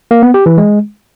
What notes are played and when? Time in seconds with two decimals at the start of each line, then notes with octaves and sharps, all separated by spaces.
0.11 A#3
0.23 B3
0.34 G4
0.46 E3
0.58 G#3